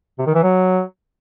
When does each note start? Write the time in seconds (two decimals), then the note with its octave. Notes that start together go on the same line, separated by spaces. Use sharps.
0.18 C3
0.26 D#3
0.35 E3
0.43 F#3